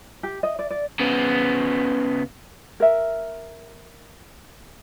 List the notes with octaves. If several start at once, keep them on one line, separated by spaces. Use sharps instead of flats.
G4
D#5
D5
D5
C#3 B3
A#4 E5